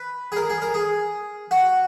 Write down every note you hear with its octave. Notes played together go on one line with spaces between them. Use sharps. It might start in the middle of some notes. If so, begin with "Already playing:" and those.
Already playing: B4
G#4
A#4
G#4
A#4
G#4
F#4